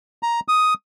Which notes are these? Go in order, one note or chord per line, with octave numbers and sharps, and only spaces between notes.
A#5
D#6